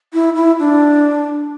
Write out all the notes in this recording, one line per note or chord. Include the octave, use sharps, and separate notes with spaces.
E4
E4
D4